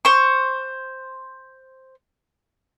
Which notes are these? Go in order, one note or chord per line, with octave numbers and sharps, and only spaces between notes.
C5 C#6